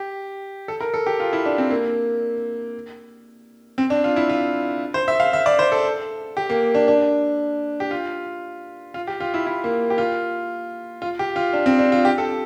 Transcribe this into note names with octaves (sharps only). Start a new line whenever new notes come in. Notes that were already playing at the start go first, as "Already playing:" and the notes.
Already playing: G4
A4
A#4
A4
G4
F4
E4
D4
C4
A#3
C4
D4
F4
E4
F4
C5
E5
F5
E5
D5
C5
A4
G4
A#3
D4
D4
G4
F4
F4
G4
F4
E4
E4
A#3
G4
F4
F4
G4
F4
D4
C4
D4
F4
G4
A4